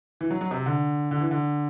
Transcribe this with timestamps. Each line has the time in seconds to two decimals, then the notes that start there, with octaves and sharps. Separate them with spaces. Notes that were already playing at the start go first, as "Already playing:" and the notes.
0.21 E3
0.31 F#3
0.41 F#3
0.51 C3
0.66 D3
1.11 D3
1.21 E3
1.31 D3